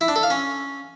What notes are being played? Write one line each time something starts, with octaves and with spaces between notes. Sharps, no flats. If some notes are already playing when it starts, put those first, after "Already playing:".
E4
D4
A4
F5
C#4